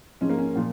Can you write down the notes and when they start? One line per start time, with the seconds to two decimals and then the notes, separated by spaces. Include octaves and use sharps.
0.21 G#2 F3 G#3 C#4
0.30 A#3
0.38 C#4
0.56 A#2 F3